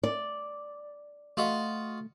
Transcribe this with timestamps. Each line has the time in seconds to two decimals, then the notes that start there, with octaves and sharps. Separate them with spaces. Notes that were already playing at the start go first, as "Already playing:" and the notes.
0.03 D5
1.37 A3 F4 F#4 D#5